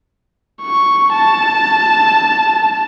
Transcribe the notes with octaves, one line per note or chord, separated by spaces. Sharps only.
C#6
A5